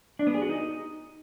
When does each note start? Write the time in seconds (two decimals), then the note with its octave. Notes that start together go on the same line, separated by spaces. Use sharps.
0.19 D4
0.27 B3
0.34 G#4
0.42 F#4
0.49 D#4